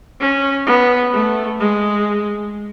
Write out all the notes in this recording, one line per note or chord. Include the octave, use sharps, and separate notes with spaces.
C#4
B3
A3
G#3